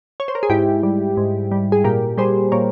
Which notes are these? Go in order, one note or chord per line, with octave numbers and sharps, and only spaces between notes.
C#5
C5
A#4
G#4
G#2 E4 G4
G3
G#2
G3
G#4
A#2 G4 A#4
G3 G#4 C5
A#2 A#4 C#5